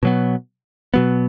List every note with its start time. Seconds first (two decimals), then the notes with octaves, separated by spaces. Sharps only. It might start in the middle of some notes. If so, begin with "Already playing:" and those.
0.03 B2 F#3 B3
0.94 B2 F#3 B3